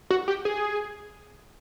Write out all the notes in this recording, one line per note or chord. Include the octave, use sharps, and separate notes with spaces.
F#4
G4
G#4